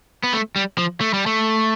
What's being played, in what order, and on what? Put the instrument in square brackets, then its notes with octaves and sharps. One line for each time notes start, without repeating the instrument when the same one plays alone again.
[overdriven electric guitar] B3
A3
G3
F3
A3
G3
A3